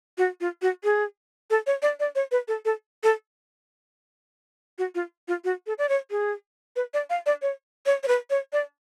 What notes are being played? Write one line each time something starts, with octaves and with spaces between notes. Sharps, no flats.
F#4
F4
F#4
G#4
A4
C#5
D5
D5
C#5
B4
A4
A4
A4
F#4
F4
F4
F#4
A4
D5
C#5
G#4
B4
D5
F5
D5
C#5
C#5
C#5
B4
C#5
D5